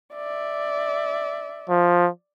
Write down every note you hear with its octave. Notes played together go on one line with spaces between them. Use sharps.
D5 E5
F3